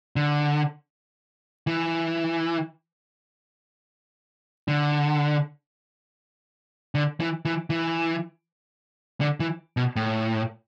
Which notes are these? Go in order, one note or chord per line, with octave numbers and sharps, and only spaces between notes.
D3
E3
D3
D3
E3
E3
E3
D3
E3
B2
A2